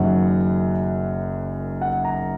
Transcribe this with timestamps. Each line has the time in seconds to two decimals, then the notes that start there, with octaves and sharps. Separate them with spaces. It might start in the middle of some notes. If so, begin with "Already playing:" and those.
Already playing: F#1 F#2 D#3 F#3 F#5
1.81 F#5
2.05 A#5